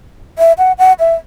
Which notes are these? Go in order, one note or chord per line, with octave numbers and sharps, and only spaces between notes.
E5
F#5
F#5
E5